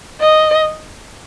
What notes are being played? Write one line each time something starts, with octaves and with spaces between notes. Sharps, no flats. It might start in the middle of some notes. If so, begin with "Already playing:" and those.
D#5